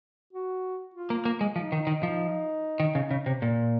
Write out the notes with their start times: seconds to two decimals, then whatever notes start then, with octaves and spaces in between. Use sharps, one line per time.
0.33 F#4
0.94 F4
1.10 A#3
1.25 A#3
1.41 G#3
1.56 F3 D#4
1.72 D#3
1.87 D#3
2.03 F3
2.80 D#3
2.95 C#3
3.11 C#3
3.26 C3
3.42 A#2